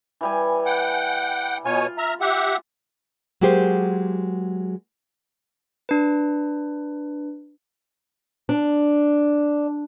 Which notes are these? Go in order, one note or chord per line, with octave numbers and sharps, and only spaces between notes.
E3 G3 G#5
F#5 G5
B2 F4 C#5 G#5
E5 A#5 F6
G4 E5 F#5
F#3 G#3 A#3 G4 G#4 C5
D4 B4
D4